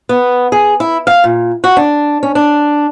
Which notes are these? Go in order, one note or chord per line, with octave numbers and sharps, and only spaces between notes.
B3
G#4
E4
F5
A#2
F#4
D4
C#4
D4